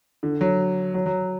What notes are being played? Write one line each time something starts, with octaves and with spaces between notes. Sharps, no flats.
D3
F#3
F#3
F#3